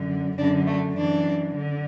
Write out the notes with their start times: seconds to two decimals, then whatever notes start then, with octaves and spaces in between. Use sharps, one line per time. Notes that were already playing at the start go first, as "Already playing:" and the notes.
Already playing: F#2 D3
0.38 F#2 D3 D4
0.67 A3
0.97 F#2 E3 D4
1.56 D3